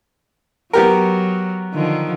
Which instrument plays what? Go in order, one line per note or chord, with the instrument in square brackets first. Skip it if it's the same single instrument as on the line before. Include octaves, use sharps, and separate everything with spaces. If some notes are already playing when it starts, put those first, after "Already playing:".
[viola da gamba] F#3 [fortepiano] B3 G4 A#4
[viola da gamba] D3 D#3 F3